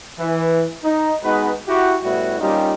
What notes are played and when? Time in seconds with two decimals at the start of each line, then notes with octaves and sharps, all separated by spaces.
0.19 E3
0.84 D#4
1.24 G#3 B3 D#4 F#4 B4
1.68 E4 F#4 G4
2.04 A2 G3 B3 E4 F#4
2.41 G3 A#3 C#4 D#4 F4 G4